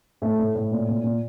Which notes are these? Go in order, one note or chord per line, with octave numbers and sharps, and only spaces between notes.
A2 A3
A2
A2
A#2
A#2
A#2